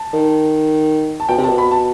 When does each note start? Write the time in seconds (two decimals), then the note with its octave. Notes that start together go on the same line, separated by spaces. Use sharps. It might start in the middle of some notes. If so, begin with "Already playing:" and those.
Already playing: A5
0.13 D#3
1.20 A5
1.29 B2 G5
1.38 C3
1.44 A5
1.49 B2
1.58 B5
1.71 A5